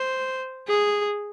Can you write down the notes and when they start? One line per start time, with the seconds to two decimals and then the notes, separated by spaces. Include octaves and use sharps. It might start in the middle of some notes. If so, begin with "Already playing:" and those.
Already playing: C5
0.68 G#4